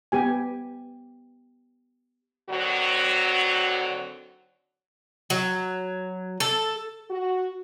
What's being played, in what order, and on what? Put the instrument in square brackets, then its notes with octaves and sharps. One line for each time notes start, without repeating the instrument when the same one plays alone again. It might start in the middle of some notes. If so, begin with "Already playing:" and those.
[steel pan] B3 G4 G#5
[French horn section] D#2 D3 F#3 C4 F#4
[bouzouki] F#3
A4
[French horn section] F#4